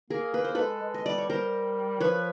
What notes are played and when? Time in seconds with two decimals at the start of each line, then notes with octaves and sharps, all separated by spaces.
0.10 A#3 G#4 A#4
0.34 A#3 B4
0.45 C5
0.55 G#3 A4 B4
0.82 G#3
0.94 D#5
1.06 G3 D5
1.18 C#5
1.29 G3 A#4 C5
2.00 F3 B4 C#5